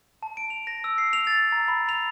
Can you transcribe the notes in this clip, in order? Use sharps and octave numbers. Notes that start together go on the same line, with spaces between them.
A5
D7
F7
A#6
E6
C7
F7
A6
A#5
B5
F7